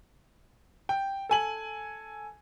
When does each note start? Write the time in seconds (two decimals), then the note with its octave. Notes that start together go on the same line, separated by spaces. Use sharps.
0.89 G5
1.29 A4 G#5 F#7